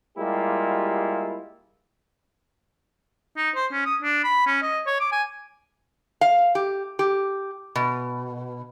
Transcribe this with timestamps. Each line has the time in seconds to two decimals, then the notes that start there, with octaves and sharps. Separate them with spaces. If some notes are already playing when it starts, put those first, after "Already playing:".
0.17 G3 G#3 A#3 E4 F4 G4
3.37 D#4
3.55 C5
3.72 C#4
3.86 D#6
4.02 D4
4.24 B5
4.47 C#4
4.62 D#5
4.87 C#5
5.00 D6
5.12 G#5
6.21 F5
6.55 G4
6.99 G4
7.75 B2